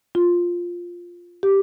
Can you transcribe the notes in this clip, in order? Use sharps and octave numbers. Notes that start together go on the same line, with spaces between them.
F4
G4